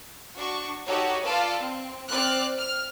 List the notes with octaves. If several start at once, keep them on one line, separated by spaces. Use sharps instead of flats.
D4 F#4 C#6
D#4 F#4 G4 A4 C#5
F4 A4 B4 D5 F5 A5
C4
C4 D5 F6 F#6
F6